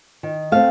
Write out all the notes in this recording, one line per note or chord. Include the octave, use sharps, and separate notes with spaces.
D#3
A3 C4 F5